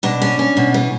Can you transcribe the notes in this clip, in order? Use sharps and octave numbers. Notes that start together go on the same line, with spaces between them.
B2 D4
C#4
C#4
B2
E3